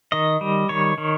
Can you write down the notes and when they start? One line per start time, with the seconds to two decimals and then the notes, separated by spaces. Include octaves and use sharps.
0.12 D#3 D#5
0.41 G3
0.69 D#3 C#5
0.98 D#3